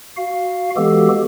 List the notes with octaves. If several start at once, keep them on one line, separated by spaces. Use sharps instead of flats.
F#4 F5
E3 G#3 B3 F#4 G4 A4